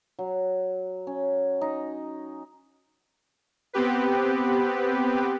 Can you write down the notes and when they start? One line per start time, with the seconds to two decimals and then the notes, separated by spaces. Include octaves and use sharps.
0.19 F#3
1.07 C#4
1.61 D#4
3.73 B3 C4 G4 B4